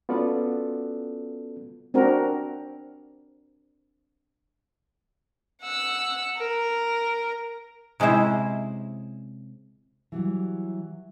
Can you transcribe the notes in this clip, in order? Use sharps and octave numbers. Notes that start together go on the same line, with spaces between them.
B3 C#4 F4 F#4 A4 D5
C4 D4 F#4 A#4
F#5 E6
A#4
C3 G#3 C#4 E4 C5
E3 F#3 G3